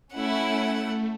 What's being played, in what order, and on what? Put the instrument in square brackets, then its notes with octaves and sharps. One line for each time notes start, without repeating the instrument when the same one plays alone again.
[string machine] A3 [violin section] C#4 E4 [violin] F#5